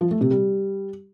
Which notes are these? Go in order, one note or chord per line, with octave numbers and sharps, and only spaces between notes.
F3
A3
C3
G3